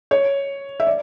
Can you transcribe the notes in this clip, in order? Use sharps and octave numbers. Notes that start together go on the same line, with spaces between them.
C#5
E5
D5